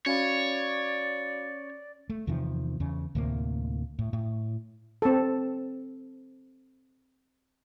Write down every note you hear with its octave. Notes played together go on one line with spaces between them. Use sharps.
C#4 F#4 C#5 D5 F5 B5
A3
E2 C3 D#3 F3
E2 C#3
D2 A2 C3 A#3
A2
A2
C4 A4